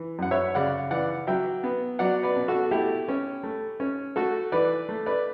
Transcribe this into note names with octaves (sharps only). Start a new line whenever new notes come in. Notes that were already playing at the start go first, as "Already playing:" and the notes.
Already playing: E3
F#2 F#5
C#5 E5
C#3 D5 F#5
E3 D5 F#5
F#3 E5 G5
B3
F#3 D5 F#5
B4 D5
B2
F#4 A4
A3 E4 G4
C#4
A3
C#4
A3 F#4 A4
E3 B4 D5
A3
B4 D5